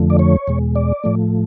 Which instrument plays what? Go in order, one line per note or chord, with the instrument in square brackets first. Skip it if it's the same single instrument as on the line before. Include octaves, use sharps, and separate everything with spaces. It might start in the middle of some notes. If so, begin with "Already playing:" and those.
Already playing: [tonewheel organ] F2 D3 F3 A3
D5
C#5
E2 B2 G#3
D5
A2 F3 A3